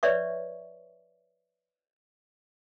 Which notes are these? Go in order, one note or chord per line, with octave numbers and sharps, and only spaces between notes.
B4 C#5 D5 E5 C#6